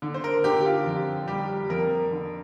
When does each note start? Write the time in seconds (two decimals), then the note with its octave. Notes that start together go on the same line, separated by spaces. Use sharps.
0.02 D3
0.14 C5
0.24 A#4
0.44 D3 G4
0.61 G4
0.66 F4
0.85 F2
1.28 G3 G4
1.69 F2 A#4
2.11 D3